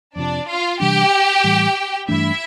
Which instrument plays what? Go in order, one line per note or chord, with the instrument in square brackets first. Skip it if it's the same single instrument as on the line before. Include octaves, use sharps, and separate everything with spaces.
[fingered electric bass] F2 C3 F3 [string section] D4 D5
[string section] F4 F5
[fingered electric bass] C3 E3 G3 D4 [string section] G4 G5
[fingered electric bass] A2 E3 G3
[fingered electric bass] G2 E3 A3 D4 [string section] E4 E5